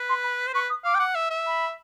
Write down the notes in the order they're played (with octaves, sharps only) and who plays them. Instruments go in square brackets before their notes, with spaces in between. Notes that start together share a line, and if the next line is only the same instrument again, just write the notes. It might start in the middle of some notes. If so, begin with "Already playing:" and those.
Already playing: [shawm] B4
[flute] C6
B5
[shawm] C5
[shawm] B4 [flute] C#6
[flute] D#6
[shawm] F5 [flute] D6
[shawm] G5
F#5
E5
E5
[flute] B5